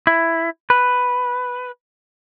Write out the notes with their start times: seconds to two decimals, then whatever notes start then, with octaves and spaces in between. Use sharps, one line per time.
0.07 E4
0.70 B4